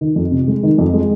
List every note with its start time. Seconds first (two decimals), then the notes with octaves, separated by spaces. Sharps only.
0.01 D#3
0.16 F2
0.32 C3
0.48 G#3
0.63 D#3
0.78 F2
0.94 G#3